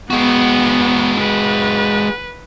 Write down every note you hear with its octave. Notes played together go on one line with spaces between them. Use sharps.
G#3 B3 F#4
B4